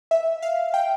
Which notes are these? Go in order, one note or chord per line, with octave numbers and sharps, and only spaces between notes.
E5
F5
G5